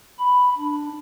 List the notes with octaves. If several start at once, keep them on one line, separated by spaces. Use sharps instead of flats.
B5
D4